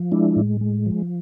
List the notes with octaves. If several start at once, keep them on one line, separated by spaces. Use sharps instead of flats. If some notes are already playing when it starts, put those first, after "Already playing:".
Already playing: F3
G#3 D4 E4
A2
G#3
F3